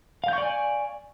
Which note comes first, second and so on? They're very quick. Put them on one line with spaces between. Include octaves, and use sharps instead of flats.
F5 G6 C#6 D5 G#5